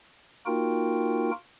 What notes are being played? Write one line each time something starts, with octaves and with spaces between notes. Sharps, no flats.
A#3 D#4 F4 F#4 A#4 G5